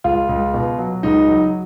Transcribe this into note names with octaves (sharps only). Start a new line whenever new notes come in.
C#2 F4
C#2
B2
F#3
C#2 D#4
F#3